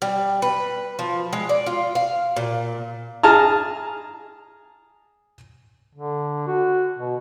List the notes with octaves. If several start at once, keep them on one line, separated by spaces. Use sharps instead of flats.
G3
B4
F3
G#3
D5
F4
F5
A#2
G#4 A5 A#5 F6
D3
F#4
B2